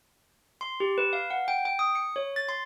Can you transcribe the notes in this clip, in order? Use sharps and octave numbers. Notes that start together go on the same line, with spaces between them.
C6
G4
B4
F5
F#5
G5
G5
D#6
C#7
C#5
A6
C6